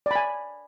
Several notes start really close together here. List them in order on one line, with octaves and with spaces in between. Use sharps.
D5 B5 G#5